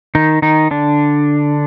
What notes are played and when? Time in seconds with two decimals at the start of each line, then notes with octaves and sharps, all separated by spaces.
0.15 D#3 D#4
0.42 D#3 D#4
0.71 D3 D4